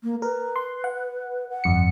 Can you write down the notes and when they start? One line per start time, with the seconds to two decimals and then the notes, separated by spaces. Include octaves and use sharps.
0.03 A#3
0.22 A#4 B4
0.56 C6
0.84 F#5
1.50 F#5
1.64 G1 F2 C#7